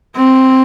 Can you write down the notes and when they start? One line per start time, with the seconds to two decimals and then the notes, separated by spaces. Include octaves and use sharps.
0.16 C4